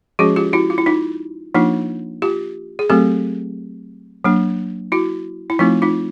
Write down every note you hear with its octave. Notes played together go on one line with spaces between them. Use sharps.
F3 G#3 C#4 F#4 G#4
F4 G4
E4 F#4
F4
E4
D#4 F4
F3 A#3 D4 D#4 F4
F4 G4
G#4
F#3 A3 C4 G4 A4
F#3 A#3 D4
E4 F#4
E4
F3 A3 C4 D#4 F4
D#4 F4